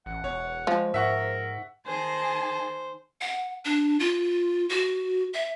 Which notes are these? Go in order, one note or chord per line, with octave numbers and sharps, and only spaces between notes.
A1 F#5
E1 C#5
F3 G#3
G#2 A#4 E5 F#5 C#6
D#3 G#4 C5 A5
F#5
D4
F4
F#4
E5